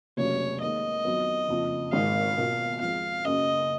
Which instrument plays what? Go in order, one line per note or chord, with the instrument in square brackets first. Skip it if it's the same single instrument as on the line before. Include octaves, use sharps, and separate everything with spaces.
[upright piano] F1 D#2 C#3 F#3 [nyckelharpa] C#5
[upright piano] D#2 D#3 G#3 D#4 [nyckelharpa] D#5
[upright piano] F2 D#3 F#3 B3 D#4
F#1 F2 F3
[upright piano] G#1 G#2 D#3 [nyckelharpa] F5
[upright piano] B1 B2 A#3 F4
[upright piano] F2 F3 G#3 [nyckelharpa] F5
[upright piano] F#1 F#2 C#3 [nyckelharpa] D#5